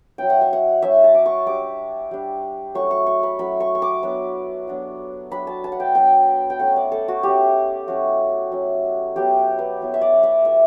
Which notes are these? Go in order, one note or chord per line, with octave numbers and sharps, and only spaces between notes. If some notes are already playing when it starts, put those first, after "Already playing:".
F#3 C#4 E4 G5
F#5
E5
F#5
F#3 C#4 E4 E5
A5
D6
C#6
G3 D4 D6
G3 D4
F#3 A3 C#4 E4 C#6
C#6
C#6
B5
F#3 A3 C#4 E4 B5
C#6
C#6
D6
F#3 B3 D4 E6
F#3 B3 D4
F#3 B3 D4 B5
A5
A5
F#5
G5
F#3 B3 D4 G5
G5
A3 C#4 E4 F#5
D5
A4
F#4
A3 C#4 E4 G4
F#3 C#4 E4 F#4
F#3 C#4 E4
F#3 B3 E4 G4
B4
F#3 B3 E4
E5
D5
E5
A3 E4 E5